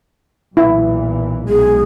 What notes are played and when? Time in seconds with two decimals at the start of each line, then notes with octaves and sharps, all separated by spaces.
0.57 B1 A#2 E3 E4
1.49 B1 G#3 G#4